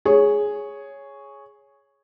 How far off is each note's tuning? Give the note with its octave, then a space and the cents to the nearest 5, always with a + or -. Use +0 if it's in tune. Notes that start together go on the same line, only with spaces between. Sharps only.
G#4 +0 C#5 +0